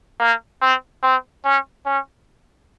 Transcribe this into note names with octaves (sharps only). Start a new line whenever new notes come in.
A#3
C4
C4
C#4
C#4